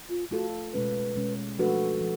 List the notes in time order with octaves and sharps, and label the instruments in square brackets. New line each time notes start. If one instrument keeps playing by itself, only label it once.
[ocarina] F4
[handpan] A3 F4 A4 [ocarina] F#4
[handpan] B2 G#3 C#4 [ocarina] B4
[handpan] B2 G#3 C#4
[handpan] F3 A3 D4 F#4 B4 [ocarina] A4
[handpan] F3